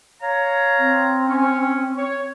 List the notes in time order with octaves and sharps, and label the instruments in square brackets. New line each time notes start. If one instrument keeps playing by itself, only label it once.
[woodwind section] C#5 F5 A#5
[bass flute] C4
[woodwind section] C#4
C#5